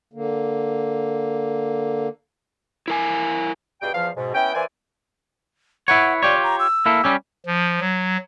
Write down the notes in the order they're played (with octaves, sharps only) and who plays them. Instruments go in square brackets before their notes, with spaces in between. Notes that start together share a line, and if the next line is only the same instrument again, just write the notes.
[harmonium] D3 A#3
[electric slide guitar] E4 A#4 G#5
[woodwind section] G2 B2 G3 G#4 G5
E2 F3 F5
G#2 B2
B3 C#4 E4 G5
E3 A#3 C5 D5 G#5
[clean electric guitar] E4 B4 C#5 [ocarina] F#5
[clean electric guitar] F4 G4 C#5 [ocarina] D5
[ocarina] A#5
E6
[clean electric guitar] A#3 E4 A4
G3 C#4 G4
[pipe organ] F3
F#3